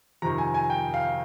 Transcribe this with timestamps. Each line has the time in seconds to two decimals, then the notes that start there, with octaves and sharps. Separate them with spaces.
0.22 F2 C3 D#3 A#5
0.38 G#5
0.54 G#5
0.70 G5
0.94 F5